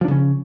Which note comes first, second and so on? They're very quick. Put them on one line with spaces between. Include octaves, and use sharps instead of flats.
F3 D4 C#3 C#4